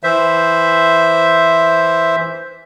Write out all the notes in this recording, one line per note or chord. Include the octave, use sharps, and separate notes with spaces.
E3 C5 E5